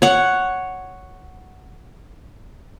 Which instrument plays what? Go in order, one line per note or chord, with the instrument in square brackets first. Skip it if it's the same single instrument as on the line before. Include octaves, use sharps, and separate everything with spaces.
[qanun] C#5 F#5